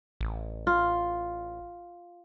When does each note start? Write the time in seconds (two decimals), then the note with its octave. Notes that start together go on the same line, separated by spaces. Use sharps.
0.21 A1
0.67 F4